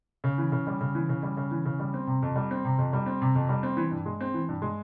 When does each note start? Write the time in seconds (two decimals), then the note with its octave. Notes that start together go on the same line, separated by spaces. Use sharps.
0.24 C#3
0.38 E3
0.52 C#3
0.67 G3
0.81 C#3
0.95 E3
1.09 C#3
1.23 G3
1.37 C#3
1.51 E3
1.65 C#3
1.80 G3
1.94 C4
2.07 C3
2.23 F2
2.36 G3
2.51 C4
2.65 C3
2.78 F2
2.93 G3
3.06 C4
3.22 C3
3.35 F2
3.49 G3
3.63 C4
3.77 E3
3.91 G2
4.06 G#3
4.21 C4
4.34 E3
4.49 G2
4.62 G#3